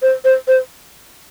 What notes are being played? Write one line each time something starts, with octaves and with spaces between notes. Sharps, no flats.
C5
C5
C5